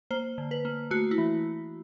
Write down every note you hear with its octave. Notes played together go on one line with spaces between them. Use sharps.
A#3 C5
D3
B4
A#3
A3 F#4
E4
E3